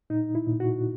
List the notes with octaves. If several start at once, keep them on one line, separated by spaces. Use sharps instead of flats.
A#2 D#4
E4
A#2
F#4